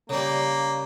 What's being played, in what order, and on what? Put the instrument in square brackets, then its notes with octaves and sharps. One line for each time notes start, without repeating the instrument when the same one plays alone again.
[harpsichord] C#3 G3 [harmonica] A#3